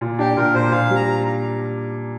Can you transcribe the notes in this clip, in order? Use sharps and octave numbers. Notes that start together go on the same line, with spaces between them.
A#2
D4 G4
A#2 A#4
A#2 C5
A#2 F5
G3
A#5